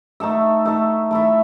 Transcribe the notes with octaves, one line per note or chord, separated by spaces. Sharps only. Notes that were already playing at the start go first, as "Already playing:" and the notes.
A3 D#4 A4 E5
A3 D#4 A4 E5
A3 E4 A4 E5